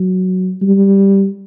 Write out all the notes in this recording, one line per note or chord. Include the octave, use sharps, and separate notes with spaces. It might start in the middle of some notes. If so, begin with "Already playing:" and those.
Already playing: F#3
G3